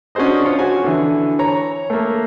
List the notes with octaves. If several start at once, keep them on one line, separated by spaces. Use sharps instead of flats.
C#4 D4 F#4 G#4 C5 D#5
F4 C#5
F#4 G#5
D3 E3
C#5 A#5
A3 A#3